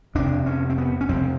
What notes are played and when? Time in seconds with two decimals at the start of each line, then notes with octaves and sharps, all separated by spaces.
0.15 F2 C3 D4
0.46 C#4
0.70 C4
0.78 B3
1.01 C#4
1.09 F2 C3 C4